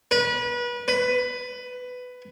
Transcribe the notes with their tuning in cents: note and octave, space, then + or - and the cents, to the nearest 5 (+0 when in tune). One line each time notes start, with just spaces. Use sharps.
B4 -30
B4 +15